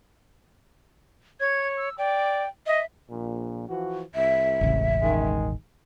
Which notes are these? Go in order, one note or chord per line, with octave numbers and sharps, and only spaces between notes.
C#5 G#6
E6
D5 G5
D#5 E5
A#1 A#2
E3 F3 F#4
C2 E5
E1 A1 C#3
D#3 G#3